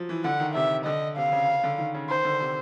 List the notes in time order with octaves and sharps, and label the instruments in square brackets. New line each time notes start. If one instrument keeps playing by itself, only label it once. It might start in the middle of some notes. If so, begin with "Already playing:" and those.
Already playing: [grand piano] F3 F#3
E3
[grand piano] D3 [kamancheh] F#5
[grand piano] D#3
[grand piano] C3 [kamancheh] E5
[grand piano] D3 [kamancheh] D#5
[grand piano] C3 [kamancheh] F5
[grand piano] C#3
C#3
D3
D#3
C#3
[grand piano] D#3 [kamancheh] C5
[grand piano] D3
C3